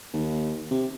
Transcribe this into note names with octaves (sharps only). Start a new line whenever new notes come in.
D#2
C3